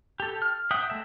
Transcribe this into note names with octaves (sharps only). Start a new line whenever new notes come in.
G4 A4
F6
E5 F#5 G5 D#6
G#3 A3 E5